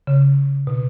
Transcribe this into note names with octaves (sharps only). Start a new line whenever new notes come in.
C#3
B2